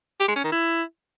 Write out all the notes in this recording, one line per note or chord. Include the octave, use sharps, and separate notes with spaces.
G4
G#3
C#4
D#3
E4